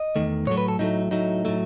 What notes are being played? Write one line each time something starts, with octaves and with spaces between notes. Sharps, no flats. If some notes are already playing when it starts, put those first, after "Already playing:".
Already playing: D#5
E2 D#3 A3
A2 F#3 A3 C#5
B4
A4
A2 F#3 A3 D#4
A2 F#3 A3 D#4
A2 F#3 A3